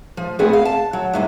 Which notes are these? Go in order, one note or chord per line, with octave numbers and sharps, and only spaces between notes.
F3
A3 B3 C4 D4 F#4 G#4
F5
A5
F#3
G2 C3 E3